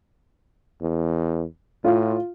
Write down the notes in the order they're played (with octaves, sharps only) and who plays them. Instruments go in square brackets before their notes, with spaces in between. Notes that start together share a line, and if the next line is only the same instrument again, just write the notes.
[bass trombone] E2
[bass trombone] A2 [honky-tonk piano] F4